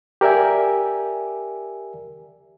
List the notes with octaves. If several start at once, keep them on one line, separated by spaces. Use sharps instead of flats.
G4 A#4 D5 E5 G#5